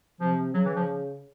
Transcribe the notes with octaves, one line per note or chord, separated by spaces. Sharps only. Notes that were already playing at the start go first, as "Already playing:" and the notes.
C3 F3
C#3 F#3
E3
F3